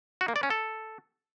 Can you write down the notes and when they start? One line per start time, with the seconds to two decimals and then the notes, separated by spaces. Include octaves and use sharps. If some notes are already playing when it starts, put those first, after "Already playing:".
0.21 F#4
0.28 A#3
0.36 D5
0.43 C#4
0.50 A4